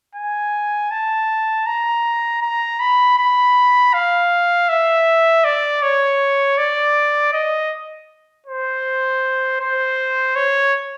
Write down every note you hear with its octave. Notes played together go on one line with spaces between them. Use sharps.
G#5
A5
A#5
A#5
B5
B5
F5
E5
D5
C#5
D5
D#5
C5
C5
C#5